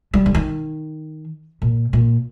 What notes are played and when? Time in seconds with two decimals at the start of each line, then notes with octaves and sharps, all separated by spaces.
0.14 G3
0.26 D3
0.35 D#3
1.62 A#2
1.93 A#2